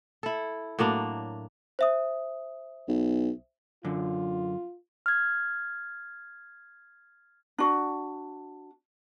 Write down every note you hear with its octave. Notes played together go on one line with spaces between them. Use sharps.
E4 A4
A2 F#3 A#3 D4
C5 E5 D#6
B1
F#2 D3 F4
F6 G#6
D4 F#4